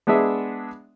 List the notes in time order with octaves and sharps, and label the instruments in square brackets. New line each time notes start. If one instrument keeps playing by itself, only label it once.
[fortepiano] G#3 B3 D4 G#4 E5